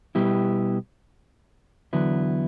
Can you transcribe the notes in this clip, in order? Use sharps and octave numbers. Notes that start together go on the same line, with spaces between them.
B2 G3 B3 E4 G4
E2 D3 F#3 B3 E4